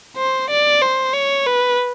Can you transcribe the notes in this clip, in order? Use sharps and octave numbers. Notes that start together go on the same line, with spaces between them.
C5
D5
C5
C#5
B4